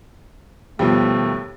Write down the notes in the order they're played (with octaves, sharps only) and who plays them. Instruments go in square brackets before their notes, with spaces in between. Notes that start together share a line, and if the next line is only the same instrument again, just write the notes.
[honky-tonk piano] D#2 [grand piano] B2 F3 G3 [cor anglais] A3